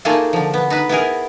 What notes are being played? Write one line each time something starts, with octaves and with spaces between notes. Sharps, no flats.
A3 A#3 D#4 F4 G#4 A4
D3 F3
B3
D#4 B4
B3 E4 G#4 A#4